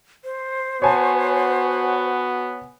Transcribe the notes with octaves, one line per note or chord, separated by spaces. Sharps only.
C5
B3 F#4 C#5 G#5 A5